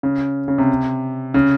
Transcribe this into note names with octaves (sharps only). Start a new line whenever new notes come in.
C#3
C#3
C3
C#3